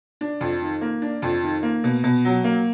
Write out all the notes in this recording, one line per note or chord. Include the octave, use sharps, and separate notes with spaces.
D4
F2
D#3
A#3
D4
F2
D#3
A#3
B2
B2
F#3
A#3